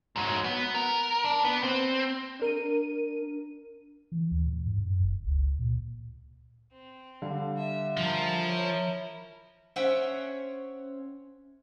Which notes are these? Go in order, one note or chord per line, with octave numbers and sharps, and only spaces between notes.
G#2 F#3
B3
A#4
D4
B3
C4
D4 A#4 D#7
E3
D#2
A2
G#2
F#2
F#1
C#2
A#2
C4
D3 G3 F5
E5
F3 E4 A#4
C#5
C#4 C5 C#5 E5 F#5 G5